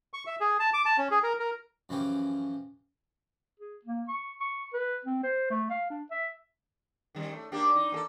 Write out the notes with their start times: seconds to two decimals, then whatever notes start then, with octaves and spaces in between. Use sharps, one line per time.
0.14 C#6
0.27 E5
0.41 G#4
0.59 A5
0.74 D6
0.86 A5
0.98 C#4
1.11 G#4
1.23 A#4
1.40 A#4
1.89 F#2 E3 F3 C#4 G4
3.60 G#4
3.85 A#3
4.08 C#6
4.40 C#6
4.74 B4
5.05 C4
5.23 C5
5.50 A3
5.70 F5
5.90 D4
6.11 E5
7.15 D#3 G3 C#4
7.33 A3
7.52 A#3 D4 G4
7.75 D#4
7.92 A#3 G#4 A4